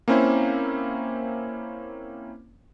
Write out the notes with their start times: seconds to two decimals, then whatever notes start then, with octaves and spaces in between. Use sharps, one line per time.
0.08 A#3 C4 C#4 E4 C5